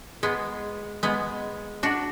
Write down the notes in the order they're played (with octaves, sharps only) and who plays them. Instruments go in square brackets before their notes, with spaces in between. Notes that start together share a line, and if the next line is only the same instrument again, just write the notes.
[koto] G#3 B3
G#3 B3
D4 F#4